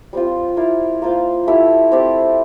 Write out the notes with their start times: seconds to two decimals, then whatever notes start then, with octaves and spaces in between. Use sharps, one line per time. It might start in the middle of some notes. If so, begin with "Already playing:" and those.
0.13 G3 C4 F4
0.57 E4 A#4 D5 F5
1.02 A#3 F4 C5 F5
1.47 A3 E4 G4
1.92 C4 G4 D5